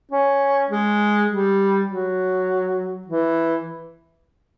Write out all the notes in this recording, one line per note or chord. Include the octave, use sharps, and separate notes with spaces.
C#4
G#3
G3
F#3
E3